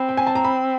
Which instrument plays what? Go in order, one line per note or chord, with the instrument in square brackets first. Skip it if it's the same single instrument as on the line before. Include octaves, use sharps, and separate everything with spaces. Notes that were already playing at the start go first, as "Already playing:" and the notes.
Already playing: [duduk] C4 [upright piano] B5
[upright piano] G5
G#5
A5
A#5
B5